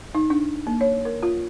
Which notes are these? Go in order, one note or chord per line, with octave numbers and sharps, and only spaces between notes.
D#4
D4
A#3
C#5
A#4
F4